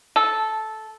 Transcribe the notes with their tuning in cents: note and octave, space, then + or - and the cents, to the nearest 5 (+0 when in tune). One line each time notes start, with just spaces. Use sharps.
A4 -10